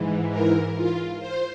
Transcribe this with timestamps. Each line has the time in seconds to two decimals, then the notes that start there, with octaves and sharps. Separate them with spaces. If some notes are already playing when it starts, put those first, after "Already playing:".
Already playing: G#2 E3
0.31 A#4
0.76 F4
1.19 C5